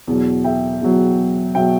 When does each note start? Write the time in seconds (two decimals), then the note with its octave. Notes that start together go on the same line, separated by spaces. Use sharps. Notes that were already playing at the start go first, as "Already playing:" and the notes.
0.08 E2 B2 F#3
0.44 E5 G5
0.81 E2 B2 F#3
1.55 B2 F#3 E5 G5